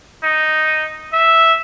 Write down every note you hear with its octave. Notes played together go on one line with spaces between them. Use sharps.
D#4
E5